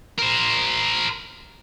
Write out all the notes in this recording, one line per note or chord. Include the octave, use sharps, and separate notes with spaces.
A#4 C5